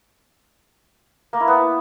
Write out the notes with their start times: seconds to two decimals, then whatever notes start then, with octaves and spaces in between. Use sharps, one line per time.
1.33 A#3
1.40 E4
1.48 B3